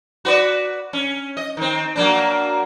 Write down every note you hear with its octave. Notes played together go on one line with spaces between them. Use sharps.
F#4 B4 D5
C#4
D#5
D#3 C4
F#3 A#3 D4